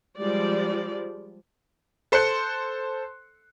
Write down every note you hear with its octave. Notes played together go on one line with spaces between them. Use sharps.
F3 G3 G#3 D5
A4 C5 C6 F#6 C#7